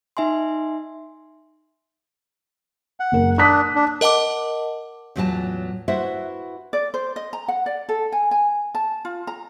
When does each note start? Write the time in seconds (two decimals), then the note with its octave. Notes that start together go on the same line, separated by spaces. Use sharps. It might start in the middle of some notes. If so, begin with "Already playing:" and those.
0.17 D#4 E5 G#5 C6
3.00 F#5
3.12 F#1 A#4
3.38 D4 D#6 F#6 B6
3.75 D4
4.01 A#4 D#5 F#5 A5 D6
5.16 E2 A2 F#3 F4 G5 A5
5.88 E4 F#4 B4 C5 E5 F#5
6.73 D5
6.94 C5
7.16 D#5
7.33 A#5
7.48 F#5
7.66 D5
7.89 A4
8.12 G#5
8.31 G#5
8.75 A5
9.05 F4
9.27 A#5